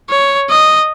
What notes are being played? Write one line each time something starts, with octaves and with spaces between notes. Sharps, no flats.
C#5
D#5